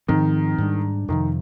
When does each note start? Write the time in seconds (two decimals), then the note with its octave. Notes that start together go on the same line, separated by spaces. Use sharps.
0.08 G#2 D#3 F3 C4
0.58 G#2 G3 D4
1.08 F2 C3 D#3 F3